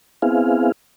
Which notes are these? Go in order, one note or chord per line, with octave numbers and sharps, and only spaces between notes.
B3 C4 E4 G#4 F5